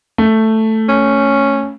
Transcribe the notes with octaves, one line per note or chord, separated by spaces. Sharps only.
A3
C#4